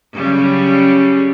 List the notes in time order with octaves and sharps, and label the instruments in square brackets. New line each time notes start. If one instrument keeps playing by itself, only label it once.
[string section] C#3 F#3 G3